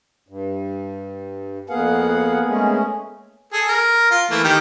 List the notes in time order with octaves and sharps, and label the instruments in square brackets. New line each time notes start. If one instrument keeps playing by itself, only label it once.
[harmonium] G2
[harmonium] F2 F5 F#5 [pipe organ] A#3 B3 G#4
[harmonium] G#3 A3 C#4
[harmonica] G#4 A4
A#4
F4
E3 A3 A#3
D#3 G4 G5